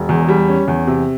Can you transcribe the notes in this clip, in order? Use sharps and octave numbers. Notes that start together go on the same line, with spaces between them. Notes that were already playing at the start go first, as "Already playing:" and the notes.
Already playing: E1
E2
G3
C#4
E2
C3